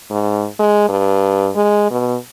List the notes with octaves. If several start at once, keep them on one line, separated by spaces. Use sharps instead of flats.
G#2
G#3
G2
G#3
B2